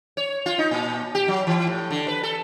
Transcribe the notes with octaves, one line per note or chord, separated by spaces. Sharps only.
C#5
F4
D#4
A#2
G4
F#3
E3
A2
D3
B4
A4